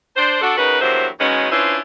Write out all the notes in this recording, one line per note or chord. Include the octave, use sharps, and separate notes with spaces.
D4 C5
D4 F#4 A4
C#3 D#4 F#4 A#4 B4
E2 G2 F#3 A#3 C5 E5
D#3 F#3 G#3 B3 C#4
C#4 D4 E4 F4 B4 C5